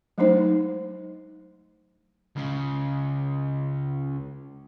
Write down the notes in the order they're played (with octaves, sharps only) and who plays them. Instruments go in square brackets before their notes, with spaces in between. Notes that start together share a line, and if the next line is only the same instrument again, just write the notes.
[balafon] F#3 G#3 A3 D4 D#4 C5
[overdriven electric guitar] C#2 C#3